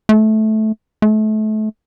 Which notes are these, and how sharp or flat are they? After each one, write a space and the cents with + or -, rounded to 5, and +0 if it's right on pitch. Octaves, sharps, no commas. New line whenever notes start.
A3 -15
A3 -30